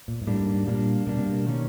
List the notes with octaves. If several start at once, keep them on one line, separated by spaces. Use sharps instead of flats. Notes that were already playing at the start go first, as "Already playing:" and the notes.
A#2
G#2
A2 G3 A#3 D4
G#2
G#2
A#2 G3 A#3 D4
B2 G3 A#3 D4
C3
B2
D#3 F#3 A#3 C#4